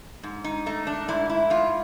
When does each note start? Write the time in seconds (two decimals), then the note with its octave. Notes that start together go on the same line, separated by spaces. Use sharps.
0.23 G#2
0.44 D#4
0.66 A3 D#4
0.87 D4
1.08 G#2 E4
1.30 E4
1.50 G#2 F4